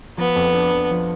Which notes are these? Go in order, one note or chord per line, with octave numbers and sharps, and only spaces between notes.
F3 B3
F2
D4
F2
F3